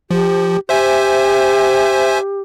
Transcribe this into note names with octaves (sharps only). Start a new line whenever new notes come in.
F3 G4
G4 C5 E5 G#5